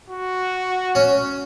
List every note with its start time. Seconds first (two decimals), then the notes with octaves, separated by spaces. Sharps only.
0.11 F#4
0.95 C#4